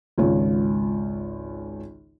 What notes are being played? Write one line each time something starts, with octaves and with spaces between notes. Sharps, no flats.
G#1 C#2 F4 C#5